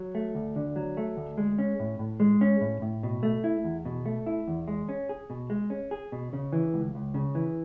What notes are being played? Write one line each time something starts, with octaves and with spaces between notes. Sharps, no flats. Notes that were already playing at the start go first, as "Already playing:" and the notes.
Already playing: F#3
A3
D2
D3
F#3
A3
D2
G#3
C#4
A2
A2
G#3
C#4
A2
A2
B2
A3
E4
E2
B2
A3
E4
E2
G#3
C#4
G#4
B2
G#3
C#4
G#4
B2
C#3
E3
C#2
C#2
C#3
E3